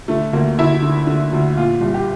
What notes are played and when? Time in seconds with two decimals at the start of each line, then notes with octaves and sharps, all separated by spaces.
0.08 D3 A3
0.33 D2 A#3
0.58 D2 E4
0.82 D3
1.07 D3
1.33 D2
1.57 A#2 F4
1.81 C2
1.94 G4